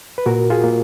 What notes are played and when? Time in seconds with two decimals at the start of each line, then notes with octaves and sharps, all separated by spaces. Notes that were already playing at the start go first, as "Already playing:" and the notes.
0.18 B4
0.26 A#2 F#4 A#4
0.50 F4 G#4
0.64 A#3